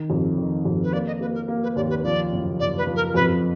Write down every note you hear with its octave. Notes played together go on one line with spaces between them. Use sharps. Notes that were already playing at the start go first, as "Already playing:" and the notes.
Already playing: D#3
F2
D#3
F2
B4
A#3 D5
D#5
A#3 B4
A#4
A#3
B4
D#2 D5
B4
F3 D5
F#1
F#1 D5
B4
F3
A#4
F2 B4